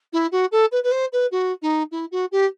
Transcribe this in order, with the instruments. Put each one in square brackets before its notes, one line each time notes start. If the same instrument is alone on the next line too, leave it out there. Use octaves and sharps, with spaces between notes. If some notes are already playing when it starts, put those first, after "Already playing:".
[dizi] E4
F#4
A4
B4
B4
C5
B4
F#4
D#4
E4
F#4
G4